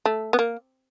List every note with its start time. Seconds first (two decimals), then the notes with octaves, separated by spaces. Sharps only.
0.06 A3
0.33 B3
0.39 A#3